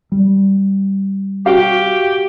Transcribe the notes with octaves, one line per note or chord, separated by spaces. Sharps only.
G3
F#4 G4 F5